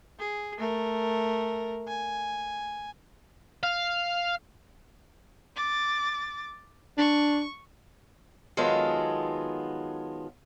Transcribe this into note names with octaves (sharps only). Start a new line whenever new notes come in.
G#4
A3 A#4
G#5
F5
D6 A6
D4 C#6
D#3 F#3 G#3 B3 F4 A4